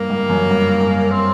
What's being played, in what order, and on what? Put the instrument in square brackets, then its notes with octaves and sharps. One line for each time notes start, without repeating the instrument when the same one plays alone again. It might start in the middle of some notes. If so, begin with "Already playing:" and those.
Already playing: [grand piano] G2 [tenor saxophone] A#3
[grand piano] G2
F#2
G2
G2
[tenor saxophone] C4